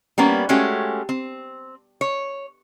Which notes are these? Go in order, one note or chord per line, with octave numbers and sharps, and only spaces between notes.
G3 A#3 B3 C#4
G#3 A3 C#4 F#4 G4
C4
C#5